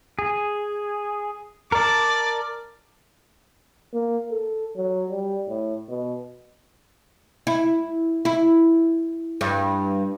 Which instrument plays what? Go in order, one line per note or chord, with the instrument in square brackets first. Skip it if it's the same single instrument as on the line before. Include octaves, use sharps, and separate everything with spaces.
[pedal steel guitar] G#4
[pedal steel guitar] A#4 A5 [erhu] D5
[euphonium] A#3
A4
F#3
G3
A2
B2
[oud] E4
E4
G2